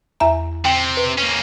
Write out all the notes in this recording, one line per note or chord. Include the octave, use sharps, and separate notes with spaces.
E2 E5 A#5
C3 G5
B4
A#3 C#4